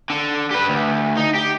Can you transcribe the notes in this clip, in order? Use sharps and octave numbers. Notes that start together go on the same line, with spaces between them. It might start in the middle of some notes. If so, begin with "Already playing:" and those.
D3
G4 B4
D2
D#4
G4